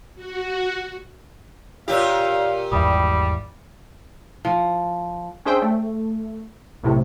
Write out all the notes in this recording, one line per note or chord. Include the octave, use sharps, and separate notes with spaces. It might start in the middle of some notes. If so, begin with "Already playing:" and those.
F#4
A#2 F4 G4 C#5 F5
G#1 E2 G3 G5 B5 D#6
F3
C#4 D4 G#4 C5 E5 G5
A3
B1 A2 C3